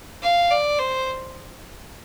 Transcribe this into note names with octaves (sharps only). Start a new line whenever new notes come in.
F5
D5
C5